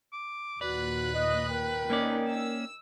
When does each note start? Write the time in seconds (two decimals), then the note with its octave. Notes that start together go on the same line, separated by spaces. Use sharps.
0.13 D6
0.61 D#2 A#2 F#4 B4 D5 F#6
1.14 D#5
1.49 A#4 G5
1.90 A#3 C#4 D#4 D5
2.29 E6